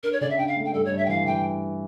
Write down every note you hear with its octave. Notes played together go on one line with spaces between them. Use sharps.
D4 A#4
C#5
C#3 D5
E5
D4 G5
F5
A3
G5
G2 A4
C#5
G2
E5
G5
E3 F5
E3 G5